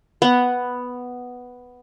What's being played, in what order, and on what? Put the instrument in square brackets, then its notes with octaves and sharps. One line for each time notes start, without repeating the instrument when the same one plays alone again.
[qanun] B3 F#5